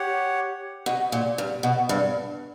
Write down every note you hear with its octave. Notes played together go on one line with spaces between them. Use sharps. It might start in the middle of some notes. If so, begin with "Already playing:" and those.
Already playing: G4 C#5 F#5
B2
A#2
G2
B2
G2